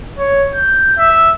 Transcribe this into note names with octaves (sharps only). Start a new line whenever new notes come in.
C#5
G6
E5